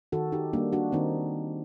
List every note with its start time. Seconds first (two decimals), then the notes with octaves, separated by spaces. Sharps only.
0.12 D#3 F#4 A4
0.32 D#4 G4
0.53 G3 A#3 D4
0.73 D4 F#4
0.92 D#3 C4 D#4